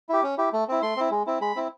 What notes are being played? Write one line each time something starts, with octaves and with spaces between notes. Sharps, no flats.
E4 G4
C#4
E4 G4
A3
C4 E4
A3 C6
C4 E4
G#3
C4 E4
G#3 B5
C4 E4